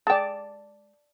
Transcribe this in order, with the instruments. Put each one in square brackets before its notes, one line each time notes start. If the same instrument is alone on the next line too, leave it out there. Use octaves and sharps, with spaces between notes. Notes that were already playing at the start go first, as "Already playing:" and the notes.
[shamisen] G#3 G5 [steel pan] D5 A5